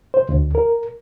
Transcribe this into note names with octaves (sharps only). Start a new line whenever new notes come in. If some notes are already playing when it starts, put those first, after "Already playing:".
C5
D2
A#4